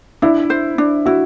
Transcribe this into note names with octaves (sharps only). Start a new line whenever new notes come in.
D4 E4
C5
D4
E4 F#4